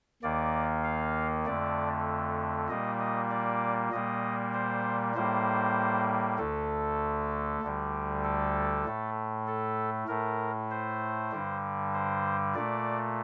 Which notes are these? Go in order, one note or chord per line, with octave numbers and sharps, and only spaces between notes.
D#2 D#3 A#3 D5
F5
F2 D3 A3 D5
A#2 G3 A#3 D#5
D#5
D5
A#2 G3 A#3 D#5
C5
A2 G3 A#3 C5
D2 D3 A3 A4
D2 D3 G3
A4
A2 A3
A4
A2 A3 A#4
C5
G2 D3 G3
C5
A#2 A3 D5